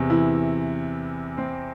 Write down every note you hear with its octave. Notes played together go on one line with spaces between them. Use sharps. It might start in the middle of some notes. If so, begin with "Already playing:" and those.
Already playing: E2 C3
E3 E4
C4 C5